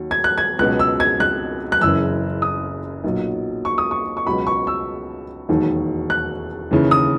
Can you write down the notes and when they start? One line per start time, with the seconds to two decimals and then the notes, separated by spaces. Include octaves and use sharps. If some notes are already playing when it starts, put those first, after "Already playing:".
Already playing: D#2 F#3
0.11 G#6
0.24 F#6
0.38 G#6
0.59 C#2 B2 F#3 F#6
0.79 E6
1.00 G#6
1.20 F#6
1.72 F#6
1.81 F#1 F#2 C#3 E3 E6
2.42 D#6
3.04 B1 A#2 F#3
3.65 C#6
3.78 D#6
3.91 C#6
4.17 C#6
4.26 C#2 B2 F#3 B5
4.47 C#6
4.67 E6
5.49 E1 D#2 D#3 F#3
6.10 F#6
6.71 D#2 C#3 E3
6.91 D#6